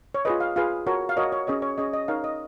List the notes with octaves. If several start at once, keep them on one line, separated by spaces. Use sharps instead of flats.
C#5
F4 G#4 B4 D#5
F5
F4 G#4 B4 F5
F#4 A#4 C#5
F5
F#4 A#4 C#5 D#5
C#5
C#4 G#4 C#5 D#5
C#5
C#4 G#4 C#5 D#5
D#5
D#4 A#4 C#5 F5
D#5